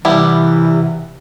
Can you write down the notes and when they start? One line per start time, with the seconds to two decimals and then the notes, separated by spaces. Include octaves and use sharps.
0.05 C3 E3 G3 B3 E4